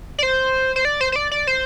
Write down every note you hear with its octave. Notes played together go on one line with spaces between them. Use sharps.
D5
C5
C5
D5
C5
C5
D5
D5
C5